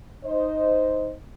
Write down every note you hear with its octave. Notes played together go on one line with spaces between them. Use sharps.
D#4 C5 D#5